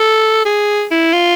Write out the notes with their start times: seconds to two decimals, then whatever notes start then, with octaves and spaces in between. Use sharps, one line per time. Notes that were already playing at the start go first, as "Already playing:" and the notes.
Already playing: A4
0.45 G#4
0.91 E4
1.13 F4